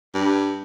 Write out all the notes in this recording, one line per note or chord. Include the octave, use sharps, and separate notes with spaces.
G2